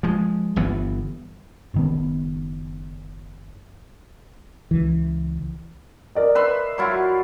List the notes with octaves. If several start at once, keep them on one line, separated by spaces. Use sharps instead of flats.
F3 G#3
G1 E3 B3
F#1 D#3 B3
C#2 E3
A#4 D5 D#5
B4 E5 C6
F#3 E4 F4